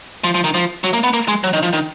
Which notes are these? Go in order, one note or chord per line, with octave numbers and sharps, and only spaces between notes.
F3
F3
D#3
F3
F#3
A#3
B3
A#3
G#3
F#3
D#3
F3
D#3